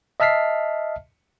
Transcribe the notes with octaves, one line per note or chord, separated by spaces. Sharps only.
D#5 E5 A5 F6 B6 C7